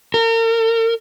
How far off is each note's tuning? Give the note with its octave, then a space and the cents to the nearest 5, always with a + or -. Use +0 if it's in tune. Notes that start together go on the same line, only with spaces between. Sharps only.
A#4 -40